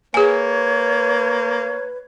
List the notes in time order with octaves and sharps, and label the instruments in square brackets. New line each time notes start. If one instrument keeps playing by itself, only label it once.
[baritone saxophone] A#3 [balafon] G#4 G#5 [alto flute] B4 [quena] C#5